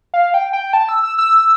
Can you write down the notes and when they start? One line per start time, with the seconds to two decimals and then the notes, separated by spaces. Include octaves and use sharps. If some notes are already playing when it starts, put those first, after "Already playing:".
0.14 F5
0.34 G5
0.53 G5
0.73 A5
0.89 E6
1.03 E6
1.18 E6